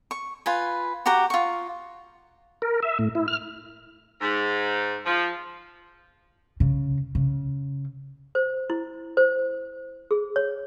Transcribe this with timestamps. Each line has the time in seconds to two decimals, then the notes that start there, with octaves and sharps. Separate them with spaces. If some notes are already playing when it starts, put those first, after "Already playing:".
0.11 C#6
0.46 F4 B4 G#5
1.06 F#4 G4 F#5 A#5
1.30 F4 C#6
2.62 A#4
2.83 E5
2.99 A2
3.15 E4
3.28 F6
4.21 G#2
5.06 F3
6.60 C#3
7.15 C#3
8.35 C5
8.70 E4
9.17 C5
10.11 G#4
10.36 C#5